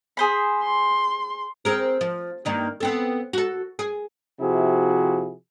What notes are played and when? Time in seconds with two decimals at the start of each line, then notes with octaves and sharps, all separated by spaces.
0.17 G#4 C5 B5
0.63 C6
1.65 C4 G#4 A#4
2.01 F3
2.45 G2 D#3 A#3
2.80 B3 C4 A4
3.33 F#4 A4
3.79 G#4
4.40 C3 F3 E4 F#4 G#4